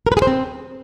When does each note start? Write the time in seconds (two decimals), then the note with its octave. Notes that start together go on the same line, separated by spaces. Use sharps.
0.07 A#4
0.12 B4
0.17 G#4
0.22 C5
0.27 C4